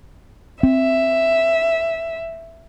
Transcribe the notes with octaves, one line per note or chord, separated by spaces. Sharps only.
C4 E5